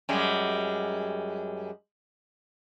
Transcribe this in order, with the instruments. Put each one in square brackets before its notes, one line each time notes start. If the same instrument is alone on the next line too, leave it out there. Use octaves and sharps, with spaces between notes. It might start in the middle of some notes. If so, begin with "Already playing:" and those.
[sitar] F#2 G3 G#3